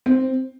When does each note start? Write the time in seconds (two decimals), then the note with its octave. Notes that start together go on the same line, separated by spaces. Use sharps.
0.06 C4